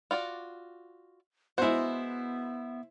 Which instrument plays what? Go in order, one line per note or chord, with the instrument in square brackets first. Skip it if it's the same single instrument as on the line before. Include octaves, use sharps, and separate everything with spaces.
[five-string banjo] F4 F#4 D5
[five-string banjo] G#3 F#4 [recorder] B3 [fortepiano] E4 C5